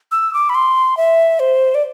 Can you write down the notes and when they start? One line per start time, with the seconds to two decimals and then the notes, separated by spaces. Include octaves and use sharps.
0.12 E6
0.34 D6
0.49 B5
0.55 C6
0.97 E5
1.40 C5
1.75 D5